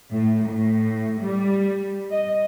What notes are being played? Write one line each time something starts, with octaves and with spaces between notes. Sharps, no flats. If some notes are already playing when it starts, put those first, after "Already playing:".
A2
A2
G3
D#5